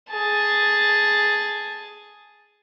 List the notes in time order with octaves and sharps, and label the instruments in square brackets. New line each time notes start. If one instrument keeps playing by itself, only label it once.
[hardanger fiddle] G#4 A5